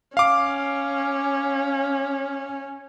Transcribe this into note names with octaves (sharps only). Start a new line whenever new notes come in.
C#4 F5 D6